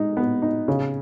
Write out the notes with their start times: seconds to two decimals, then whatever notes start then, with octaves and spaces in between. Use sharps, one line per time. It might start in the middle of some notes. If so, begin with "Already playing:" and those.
Already playing: G#3 D#4
0.17 B3
0.42 D#4
0.68 C#3